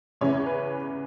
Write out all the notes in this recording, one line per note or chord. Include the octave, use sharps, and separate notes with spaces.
E2 C#3 E3 C#4 C#5
B4